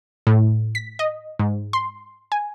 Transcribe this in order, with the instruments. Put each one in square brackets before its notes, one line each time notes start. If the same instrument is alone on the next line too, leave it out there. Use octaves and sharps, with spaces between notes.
[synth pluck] A2
B6
D#5
G#2
C6
G#5